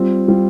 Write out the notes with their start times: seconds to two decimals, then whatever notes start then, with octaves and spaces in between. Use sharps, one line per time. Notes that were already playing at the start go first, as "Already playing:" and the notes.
Already playing: G3 C4 F4
0.28 G3 C4 F4